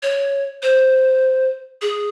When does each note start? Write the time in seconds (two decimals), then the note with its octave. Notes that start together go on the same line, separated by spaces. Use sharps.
0.03 C#5
0.63 C5
1.82 G#4